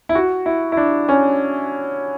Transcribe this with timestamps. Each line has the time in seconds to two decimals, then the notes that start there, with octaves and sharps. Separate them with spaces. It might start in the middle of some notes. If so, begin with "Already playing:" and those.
0.09 E4
0.15 F#4
0.46 E4
0.72 E4
0.77 D4
1.09 C#4